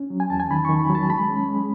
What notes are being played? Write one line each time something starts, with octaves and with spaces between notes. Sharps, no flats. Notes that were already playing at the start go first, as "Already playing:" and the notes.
Already playing: C#4
F#3
G#5
E2 A5
G#5
D#3 B5
C#6
D#3
B5
F#3
A5
G#3 B5
C#4
G#3